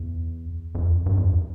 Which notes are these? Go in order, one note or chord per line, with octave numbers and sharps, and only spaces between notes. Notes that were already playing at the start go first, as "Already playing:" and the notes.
Already playing: E2
F2
G2
F2